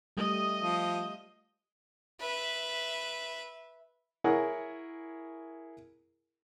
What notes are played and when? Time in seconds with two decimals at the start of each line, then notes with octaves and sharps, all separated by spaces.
0.17 G3 A3 D#5 D#6
0.61 F3
2.20 B4 E5
4.24 E4 G#4 A#4 C#5 F#5